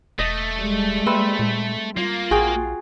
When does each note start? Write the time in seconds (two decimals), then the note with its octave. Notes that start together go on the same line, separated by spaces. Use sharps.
0.19 E1 A3 D#5
0.55 G3 G#3
1.06 A#3 C4 B4 E5
1.39 A#2
1.97 G3 A#3 F4
2.31 A#1 F#4 G#4 G5